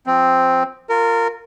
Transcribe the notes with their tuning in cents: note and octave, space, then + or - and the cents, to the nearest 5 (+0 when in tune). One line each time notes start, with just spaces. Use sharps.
F3 +0 C4 +0
F4 +10 A#4 -20